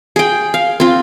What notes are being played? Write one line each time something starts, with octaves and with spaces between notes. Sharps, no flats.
G#4 G5
F5
C4 F4